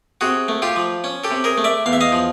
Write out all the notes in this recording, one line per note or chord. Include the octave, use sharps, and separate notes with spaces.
C3 F#4 G#4
A3
F4 G4
F3
C#4
G4 A4
C3
G#4 A#4
A3
D5 E5
E2 F5
E5
D#5 F5
F3